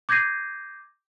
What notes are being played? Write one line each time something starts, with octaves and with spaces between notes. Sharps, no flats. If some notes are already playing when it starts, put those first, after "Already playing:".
D6 G6 G#6 A#6 C7 D#7